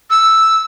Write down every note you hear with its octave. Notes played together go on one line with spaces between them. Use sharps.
E6